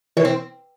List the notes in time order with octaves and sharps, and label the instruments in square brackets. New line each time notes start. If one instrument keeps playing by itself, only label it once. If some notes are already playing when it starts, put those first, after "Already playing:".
[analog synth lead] E3 [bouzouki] C#4
[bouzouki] C4